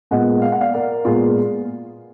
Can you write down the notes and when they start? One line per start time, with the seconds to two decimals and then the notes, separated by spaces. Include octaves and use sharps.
0.11 A#2 G#3 B3 D#5 F#5
0.42 F5
0.52 F#5
0.61 D5 F5
0.74 A#4 D5
1.05 A#2 G#3 B3 F4 G#4